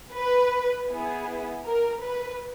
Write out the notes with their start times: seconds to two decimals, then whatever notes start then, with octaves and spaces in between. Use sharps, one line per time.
0.15 B4
0.90 B3 E4 G#4
1.67 A#4
2.04 B4